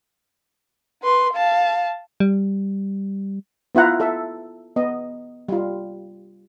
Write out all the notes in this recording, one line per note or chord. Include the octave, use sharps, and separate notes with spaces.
B4 C6
F5 A5
G3
B3 E4 F4 F#5 A#5
A4 E5
B3 D#5
G3 F4